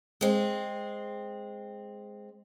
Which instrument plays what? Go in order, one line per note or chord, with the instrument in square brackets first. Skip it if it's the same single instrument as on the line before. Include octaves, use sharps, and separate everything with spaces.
[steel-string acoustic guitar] G#3 C4